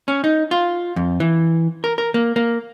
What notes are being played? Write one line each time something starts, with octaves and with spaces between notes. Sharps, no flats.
C#4
D#4
F4
F2
E3
A#4
A#4
A#3
A#3